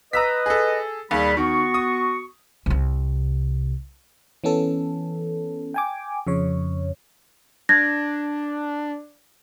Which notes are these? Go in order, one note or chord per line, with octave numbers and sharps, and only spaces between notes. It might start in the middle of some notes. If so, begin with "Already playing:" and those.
B4 D#5 A#5 E6 B6
G#4 A4
D#2 G3 G#4 B5
D#3 B3 F#4 C#6
D#6
C2 C3
E3 B3 C#4 A4
G5 G#5 D6
F2 C#3 C#5
D4 G#6 A#6